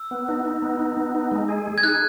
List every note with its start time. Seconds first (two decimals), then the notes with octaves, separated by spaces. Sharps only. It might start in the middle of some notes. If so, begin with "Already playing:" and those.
Already playing: E6
0.11 B3
0.28 D#4
0.45 D#4
0.62 B3
0.79 D#4
0.97 B3
1.14 D#4
1.31 G#3
1.48 G#4
1.66 G#4
1.78 G#6
1.83 D#4 F#6